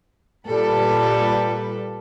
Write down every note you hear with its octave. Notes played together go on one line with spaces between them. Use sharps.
A#2 G3 A4 B4